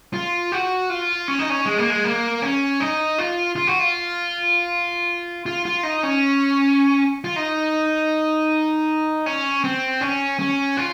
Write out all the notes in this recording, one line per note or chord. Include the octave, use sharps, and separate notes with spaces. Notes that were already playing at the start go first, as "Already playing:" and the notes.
F4
F#4
F4
C#4
D#4
C#4
G#3
A#3
G#3
A#3
C#4
D#4
F4
F4
F#4
F4
F4
F4
D#4
C#4
F4
D#4
C#4
C4
C#4
C#4
F4